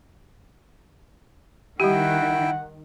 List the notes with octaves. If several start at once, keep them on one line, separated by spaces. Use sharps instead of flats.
D#3 G3 E4 G4 F#5 G5